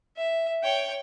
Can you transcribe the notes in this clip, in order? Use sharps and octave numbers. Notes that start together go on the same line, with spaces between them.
E5
C#5 G5